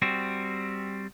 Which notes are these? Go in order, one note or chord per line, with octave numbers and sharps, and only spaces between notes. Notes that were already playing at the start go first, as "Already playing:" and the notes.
G3 C4 F#4